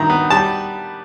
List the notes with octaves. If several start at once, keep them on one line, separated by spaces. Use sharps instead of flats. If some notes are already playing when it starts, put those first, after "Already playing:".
Already playing: G2 D#3 A#5
B3
G3 A5